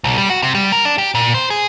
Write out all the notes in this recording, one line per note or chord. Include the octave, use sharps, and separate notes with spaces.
B1
G3
F#4
C3
G3
A#4
D4
G4
A#2
C5
G#4